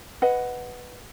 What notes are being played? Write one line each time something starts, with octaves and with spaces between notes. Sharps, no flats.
B4 D#5 F#5